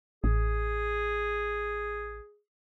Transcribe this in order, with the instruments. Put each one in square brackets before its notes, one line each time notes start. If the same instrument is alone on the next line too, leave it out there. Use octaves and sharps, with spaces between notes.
[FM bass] A1 [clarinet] G#4